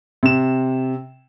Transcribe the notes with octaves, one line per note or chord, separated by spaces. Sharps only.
C3 E7